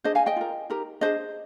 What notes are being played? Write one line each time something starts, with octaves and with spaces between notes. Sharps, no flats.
D4 G#4 C5 D#5
F5 G#5
D#5 G5
F4 A#4
D#4 G4 A#4
D4 G#4 C5 D#5